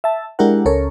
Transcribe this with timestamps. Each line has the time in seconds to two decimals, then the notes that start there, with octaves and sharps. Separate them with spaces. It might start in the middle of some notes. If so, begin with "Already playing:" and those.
0.04 E5 A5
0.39 G#3 D4 E4 G4 A#4 F#5
0.65 C#2 C#4 A4 A#4 C#5